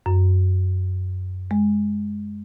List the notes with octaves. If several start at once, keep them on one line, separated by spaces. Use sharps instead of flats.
F#2
G#3